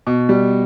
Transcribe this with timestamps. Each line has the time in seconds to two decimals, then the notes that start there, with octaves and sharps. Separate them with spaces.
0.07 B2
0.29 G3